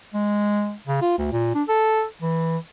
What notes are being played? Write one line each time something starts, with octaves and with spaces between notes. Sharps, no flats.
G#3
C#3
F4
D2
A#2
D4
A4
E3